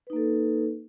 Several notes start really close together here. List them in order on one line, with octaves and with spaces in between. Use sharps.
B4 D#4 A#3 A4